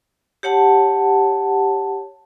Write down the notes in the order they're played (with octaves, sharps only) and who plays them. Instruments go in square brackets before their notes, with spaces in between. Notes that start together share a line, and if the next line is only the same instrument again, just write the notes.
[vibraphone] G4 C#5 F#5 A5